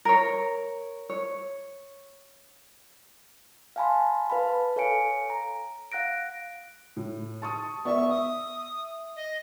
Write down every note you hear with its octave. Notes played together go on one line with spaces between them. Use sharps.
A#4 C#5
C#5
F5 F#5 G#5 A5 B5 C6
B4 F5 A5 B5
A4 C#5 F5 G#5 C#7 D7
A#5
F5 F#5 F#6 A#6 D7
A2
A5 C#6 D#6
B3 D5 E5 C#6
E5 D#6
D#5